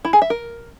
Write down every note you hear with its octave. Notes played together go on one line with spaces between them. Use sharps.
E4
G#4
E5
A#4